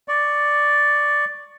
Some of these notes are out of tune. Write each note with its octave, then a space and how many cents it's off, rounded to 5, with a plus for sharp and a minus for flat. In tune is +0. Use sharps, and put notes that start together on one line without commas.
D5 +0 C#6 +0